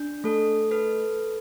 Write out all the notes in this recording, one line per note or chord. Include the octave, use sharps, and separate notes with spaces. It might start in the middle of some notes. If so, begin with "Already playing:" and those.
Already playing: D4
A3 A4
A4 B4